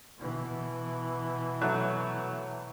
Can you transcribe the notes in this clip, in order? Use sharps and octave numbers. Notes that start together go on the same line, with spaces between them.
B2 E3
F#3 A3 F#6